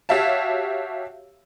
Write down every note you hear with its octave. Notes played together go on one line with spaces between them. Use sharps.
F#4 G4 C#5 E5 F5 A5